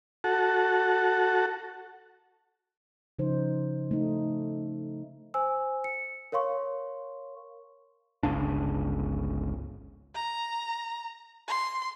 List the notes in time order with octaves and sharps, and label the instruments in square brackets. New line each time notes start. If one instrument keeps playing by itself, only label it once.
[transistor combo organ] F#4 A4
[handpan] C#3 F3 D#4 C5
A3 D#4
[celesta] C5 G#5 E6
C#7
A#4 C#5 F5 C6 C#6
[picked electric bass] G1 C#2 C#3 D4
[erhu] A#5
C6